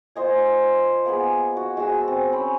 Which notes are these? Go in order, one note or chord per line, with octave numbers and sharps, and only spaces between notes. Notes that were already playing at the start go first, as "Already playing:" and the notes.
F4 C5 D#5 G#5
A#3 B3 G#4
F#4
G#3 F#4 A5 E6
C4
C#4 C5 B5